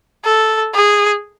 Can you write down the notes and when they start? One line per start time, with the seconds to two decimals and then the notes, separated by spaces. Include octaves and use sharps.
0.25 A4
0.74 G#4